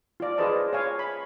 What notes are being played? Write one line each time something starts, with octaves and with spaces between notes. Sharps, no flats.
F4 D5
F4 G#4 B4 C5 D#5 A5
C#5 F5 G#5
B5